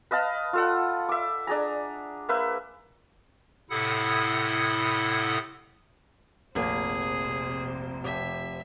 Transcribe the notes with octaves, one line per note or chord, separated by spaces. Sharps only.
B4 D#5 F5 A5
F4 A4 F#5
E5 D6
D4 G#4 A#5
A#3 B4 E5
A2 C3 E4 A4 F#5 D#6
F1 A#1 C3 A#3 G#4 C5
F1 G4 E5